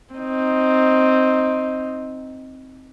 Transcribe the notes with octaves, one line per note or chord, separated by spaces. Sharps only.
C4 D#4